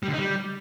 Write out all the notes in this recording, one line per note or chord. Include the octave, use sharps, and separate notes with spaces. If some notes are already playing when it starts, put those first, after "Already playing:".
G3
D3
D#4
G3